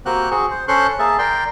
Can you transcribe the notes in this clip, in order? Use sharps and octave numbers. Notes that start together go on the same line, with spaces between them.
A#3 C4 F#4 G4 F#6
C4 F#4 G#4 C#6
C5
C#4 A4 C5 C6 C#6 F#6
A#3 G#4 E5 A5
A#4 D5 G5 C6